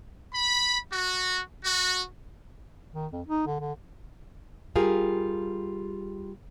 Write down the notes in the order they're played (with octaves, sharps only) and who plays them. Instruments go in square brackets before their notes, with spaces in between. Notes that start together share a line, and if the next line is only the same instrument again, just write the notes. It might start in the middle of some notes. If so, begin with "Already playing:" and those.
[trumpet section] B5
F#4
F#4
[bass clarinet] D#3
F2
D#4
D3
D3
[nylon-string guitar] G3 F4 G4 G#4 A#4 F5